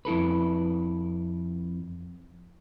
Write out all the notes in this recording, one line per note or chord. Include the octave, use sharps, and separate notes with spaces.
F2 E4 A4 B4